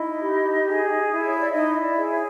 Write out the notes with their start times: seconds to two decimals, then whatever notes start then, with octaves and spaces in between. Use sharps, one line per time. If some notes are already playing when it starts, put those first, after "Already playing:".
Already playing: D#4 E4 D#5
0.23 G4
0.67 G#4
1.09 E4
1.27 C#5
1.39 D5
1.52 D#4 E4 D#5
1.75 D#5
1.81 D5
1.96 G#4
2.10 C#5